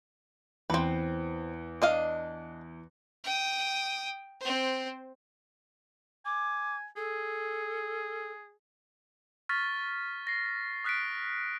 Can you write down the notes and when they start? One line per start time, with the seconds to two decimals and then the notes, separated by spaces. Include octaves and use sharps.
0.70 E2 C4 B4
1.82 D4 D#5 F5
3.24 G5 D#6
4.41 C4 C5
6.25 G#5 D6
6.96 G#4 A4
9.49 C#6 F6 A6 B6
10.27 A#6 C7
10.84 D#6 F6 F#6 B6 C7 D7